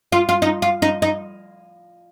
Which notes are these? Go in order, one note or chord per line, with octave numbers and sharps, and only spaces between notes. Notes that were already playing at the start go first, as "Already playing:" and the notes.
F4
F4
D#4
F4
D#4
D#4